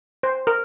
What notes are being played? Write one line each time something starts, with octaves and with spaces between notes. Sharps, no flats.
C5
A#4